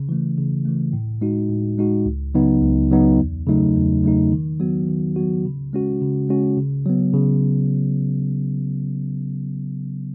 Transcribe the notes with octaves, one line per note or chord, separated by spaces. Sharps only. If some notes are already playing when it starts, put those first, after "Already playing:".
Already playing: C#3
E3 A3
C#3
E3 A3
A2
G#3 D#4 F#4
A2
G#3 D#4 F#4
C#2
C#3 F#3 B3 D#4
C#2
C#3 F#3 B3 D#4
E2
C#3 F#3 A3 D#4
E2
C#3 F#3 A3 D#4
D#3
F#3 B3 F#4
D#3
F#3 B3 F#4
C#3
G#3 C#4 F#4
C#3
G#3 C#4 F#4
C#3
F#3 B3
C#3